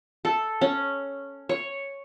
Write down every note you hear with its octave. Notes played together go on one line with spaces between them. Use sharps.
A4
C#4
C#5